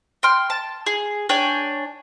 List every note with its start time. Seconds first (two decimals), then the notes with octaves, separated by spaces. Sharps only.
0.23 G5 C6 F6
0.50 A5
0.86 G#4
1.29 D4 C#5 G5 G#5